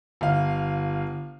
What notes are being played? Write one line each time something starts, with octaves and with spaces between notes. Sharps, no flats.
G1 F5